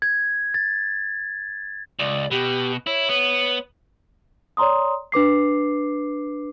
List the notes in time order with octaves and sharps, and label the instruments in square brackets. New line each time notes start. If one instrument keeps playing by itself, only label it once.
[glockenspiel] G#6
A6
[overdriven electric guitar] C#2 [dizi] D5
[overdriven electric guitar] B2 [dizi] G4
[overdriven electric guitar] E4 [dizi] C#5
[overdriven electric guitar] B3
[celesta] C#5 D5 A#5 C6 D#6
D4 B4 D6 C7